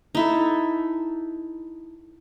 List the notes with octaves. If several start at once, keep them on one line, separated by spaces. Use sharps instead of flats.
D#4 E4 A4